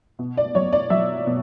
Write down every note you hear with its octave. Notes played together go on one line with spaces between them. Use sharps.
B2
D5
F#3 C#5
D5
F#3 E5
B2